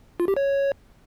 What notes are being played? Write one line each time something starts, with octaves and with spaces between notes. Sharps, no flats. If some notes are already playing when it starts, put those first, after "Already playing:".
F4
G4
C#5